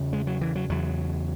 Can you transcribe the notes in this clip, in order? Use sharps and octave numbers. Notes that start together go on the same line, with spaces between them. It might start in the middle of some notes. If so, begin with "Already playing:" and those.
Already playing: E2 C#3
G#3
F#3
E3
F#3
E2 C#3 F#3